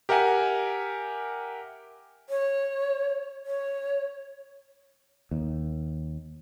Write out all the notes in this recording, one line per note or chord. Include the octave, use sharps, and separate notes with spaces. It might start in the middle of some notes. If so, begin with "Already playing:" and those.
G4 A#4 E5 F#5 G#5
C#5
C#5
D#2